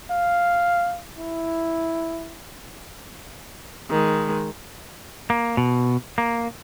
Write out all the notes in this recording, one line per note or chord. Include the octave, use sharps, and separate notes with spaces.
F5
E4
D#3 G#3
A#3
B2
A#3